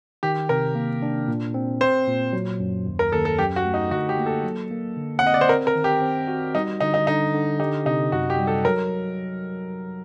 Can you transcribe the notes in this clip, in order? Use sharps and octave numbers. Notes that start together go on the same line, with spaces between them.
D#3 G4
C3 A#4
A#3
D4
A#2
C4
C4 C5
A#2
F#3
F#2
D#2
A#4
D#2 A4
A4
F#2 G4
F#4
A3
D#4
D3 F#4
G4
A#3
A4
F#3
A#3
D3
F#5
C4 D#5
D5
C5
C4 A#4
A#4
D#3
G4
C4
F#4
G3 D#4
D3 D#4
D#4
D3 D#4
D3
D#4 G4
C3 D#4
F#2 F#4
G4
G3
A4
F#3 A#4